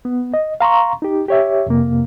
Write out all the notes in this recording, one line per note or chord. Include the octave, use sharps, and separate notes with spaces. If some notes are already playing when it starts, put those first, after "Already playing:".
B3
D#5
F5 A#5 C6 C#6
D#4 G4
G4 C#5 E5
F2 C3 A#3